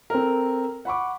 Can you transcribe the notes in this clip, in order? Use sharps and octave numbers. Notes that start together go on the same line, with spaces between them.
C4 A4 A#4
F#5 B5 C#6 D6